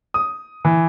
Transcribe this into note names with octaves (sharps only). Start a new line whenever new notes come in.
D#6
E3